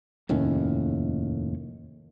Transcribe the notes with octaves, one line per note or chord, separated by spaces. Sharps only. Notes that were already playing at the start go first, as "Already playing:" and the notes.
F1 D#2 A2 C#4